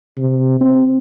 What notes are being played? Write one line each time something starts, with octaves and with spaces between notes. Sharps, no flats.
C3
C4